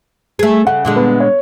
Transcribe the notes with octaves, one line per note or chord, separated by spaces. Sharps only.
A3 G#4
C#3 F#5
A#2 D3 G#3
B3
C#5